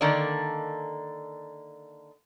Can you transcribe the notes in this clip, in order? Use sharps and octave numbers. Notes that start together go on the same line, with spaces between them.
D3 D#3 A#3 D4 D5